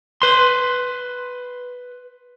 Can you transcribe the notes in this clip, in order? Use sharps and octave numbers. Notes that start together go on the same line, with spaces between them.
B4 C6